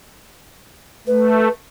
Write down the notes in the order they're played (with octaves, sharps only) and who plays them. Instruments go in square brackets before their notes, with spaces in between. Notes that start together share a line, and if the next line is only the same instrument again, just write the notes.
[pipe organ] A3 [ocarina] B4